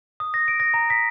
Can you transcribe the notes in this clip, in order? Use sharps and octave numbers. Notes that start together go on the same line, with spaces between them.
D#6
A#6
D7
A#6
A#5
B6